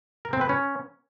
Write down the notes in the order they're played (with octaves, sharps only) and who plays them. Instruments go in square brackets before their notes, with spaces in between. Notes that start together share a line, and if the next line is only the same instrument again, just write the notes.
[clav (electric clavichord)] A#4
C4
B4
C#4